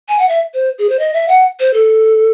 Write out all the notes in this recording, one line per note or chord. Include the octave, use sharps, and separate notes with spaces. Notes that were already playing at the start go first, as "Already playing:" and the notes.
G#5
F#5
E5
C5
G#4
C5
D#5
E5
F#5
C5
A4